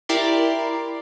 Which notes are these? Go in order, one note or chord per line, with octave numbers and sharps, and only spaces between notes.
E4 G4 A#4 D5 C6